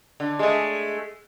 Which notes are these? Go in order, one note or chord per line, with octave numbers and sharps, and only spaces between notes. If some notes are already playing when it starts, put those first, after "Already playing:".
D3
G#3 A3